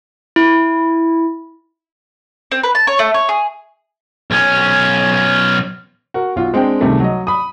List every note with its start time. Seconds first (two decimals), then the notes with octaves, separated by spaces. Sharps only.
0.36 E4
2.51 C4
2.63 B4
2.75 A5
2.87 C#5
2.99 A3
3.14 C#5
3.29 G#4
4.31 B1 C#4
6.14 F#4 A#4
6.36 B1 F4 F#4
6.54 G#3 C4 D4 G5
6.81 C#2 C3 D#3 G3 A3
7.00 F#3 D#5
7.27 B5 D#6